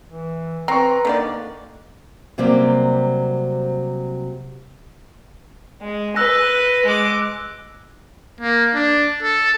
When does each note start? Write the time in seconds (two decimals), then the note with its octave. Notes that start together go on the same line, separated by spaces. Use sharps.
0.07 E3
0.68 C4 B4 A#5 C#6
1.05 D3 D#3 A#3 D5
2.38 C3 F#3 G3 A#3 C4
5.81 G#3
6.16 B4 E6 F#6 A#6
6.85 G#3 D6
8.41 A#3
8.74 D4
9.23 A4